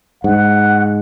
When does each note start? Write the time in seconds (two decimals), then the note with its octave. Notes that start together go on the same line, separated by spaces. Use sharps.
0.24 G#2 F#5